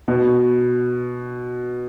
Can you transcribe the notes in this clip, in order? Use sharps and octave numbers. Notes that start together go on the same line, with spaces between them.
B2